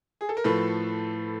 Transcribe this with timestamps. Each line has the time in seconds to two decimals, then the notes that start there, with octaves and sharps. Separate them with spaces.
0.21 G#4
0.29 A4
0.37 A#4
0.44 A2 F3 A3 A4 B4